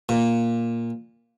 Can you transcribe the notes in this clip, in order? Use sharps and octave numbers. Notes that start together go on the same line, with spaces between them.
A#2